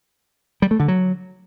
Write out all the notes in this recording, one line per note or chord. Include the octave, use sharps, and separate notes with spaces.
G3
A3
D3
F#3